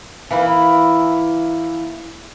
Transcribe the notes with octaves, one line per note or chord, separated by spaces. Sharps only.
E3 A#3 E4